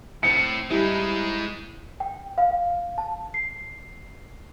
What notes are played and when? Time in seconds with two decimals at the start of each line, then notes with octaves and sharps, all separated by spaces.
0.23 A2 C4 A5 C#7
0.70 G3 G#3 D#4 E4
2.00 G5
2.38 F5
2.98 A5
3.34 C7